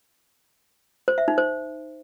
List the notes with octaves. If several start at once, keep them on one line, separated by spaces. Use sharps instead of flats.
C5
E5
D#4
C5